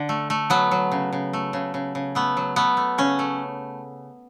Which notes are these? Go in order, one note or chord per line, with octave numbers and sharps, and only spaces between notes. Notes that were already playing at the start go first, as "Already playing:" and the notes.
Already playing: D3
A3
A3
F#3 B3
F#3
C#3
C#3
A3
C#3
C#3
C#3
A3 B3
F#3
A3 B3
A3
C#3 C#4
A3